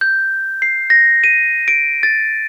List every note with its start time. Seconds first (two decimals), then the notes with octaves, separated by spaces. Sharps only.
0.01 G6
0.62 C7
0.90 A#6
1.24 D#7
1.68 D7
2.03 A6